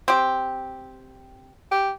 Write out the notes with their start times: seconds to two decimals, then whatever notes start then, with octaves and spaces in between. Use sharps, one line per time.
0.08 C4 G4
1.71 G4